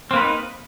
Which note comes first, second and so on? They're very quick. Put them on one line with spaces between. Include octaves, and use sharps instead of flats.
C4 A#3 B4 D#4